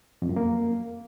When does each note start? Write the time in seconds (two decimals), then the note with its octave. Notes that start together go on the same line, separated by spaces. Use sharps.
0.22 F2
0.29 F#2
0.36 A#3